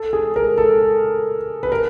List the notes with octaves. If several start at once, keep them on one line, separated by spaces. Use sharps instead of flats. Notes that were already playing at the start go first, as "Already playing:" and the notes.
Already playing: A4
G#4
A#4
A4
B4
A#4